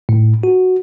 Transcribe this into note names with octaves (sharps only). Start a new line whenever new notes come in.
A2
F#4